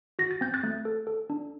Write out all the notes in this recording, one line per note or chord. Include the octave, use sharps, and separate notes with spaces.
F#4 A#6
A6
C4 G6
F#6 A6
A3
A4
A4
D4